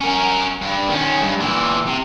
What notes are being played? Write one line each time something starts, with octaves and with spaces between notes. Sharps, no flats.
C#4 A#4
G2
D#3 C#4
G2
A#2 E3
C3